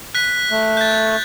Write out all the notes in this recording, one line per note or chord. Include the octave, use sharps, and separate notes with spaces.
F#6 B6
A3
G6 A6